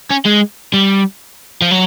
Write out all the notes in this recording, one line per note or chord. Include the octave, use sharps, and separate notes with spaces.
C#4
G#3
G3
F3
F#3